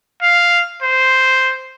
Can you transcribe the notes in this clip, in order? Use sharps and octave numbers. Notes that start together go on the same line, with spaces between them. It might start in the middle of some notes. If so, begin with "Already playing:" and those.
F5
C5